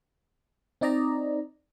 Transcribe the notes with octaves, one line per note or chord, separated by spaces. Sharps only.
C4 D#4 D5 D#5 A#5